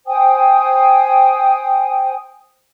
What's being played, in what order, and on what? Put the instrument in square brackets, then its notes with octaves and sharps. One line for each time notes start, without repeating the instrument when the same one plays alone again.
[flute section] C5 G5 G#5 D#6